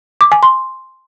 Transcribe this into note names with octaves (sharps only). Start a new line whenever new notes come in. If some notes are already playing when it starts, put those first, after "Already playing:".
D6
G#5
C6